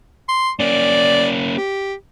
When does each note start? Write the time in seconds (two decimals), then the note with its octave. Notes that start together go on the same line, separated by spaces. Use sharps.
0.29 C6
0.60 A#3 C#4 D5
1.56 G4